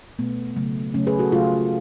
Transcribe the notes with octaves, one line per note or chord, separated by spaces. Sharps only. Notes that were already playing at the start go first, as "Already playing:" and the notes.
B2 A3 B3
C#3 F#3 A3
C#3 F#3 A3 C#4
G#4 B4
F#4 A4
C#3 F#3 A3 F4 G#4